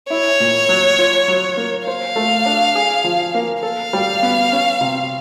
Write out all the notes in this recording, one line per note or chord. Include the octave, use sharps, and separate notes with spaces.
E4 C#5
A#2
F#3
F4
F#3
A#3
C5 F5
A3
D4
G#4
F3
A#3
A4 F5
G3
B3
C#4
C3